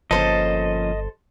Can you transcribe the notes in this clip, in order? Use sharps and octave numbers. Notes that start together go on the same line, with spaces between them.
G1 F3 A#3 C#4 A4 B4 C5 D#5